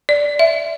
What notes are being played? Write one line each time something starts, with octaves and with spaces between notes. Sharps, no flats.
D5
E5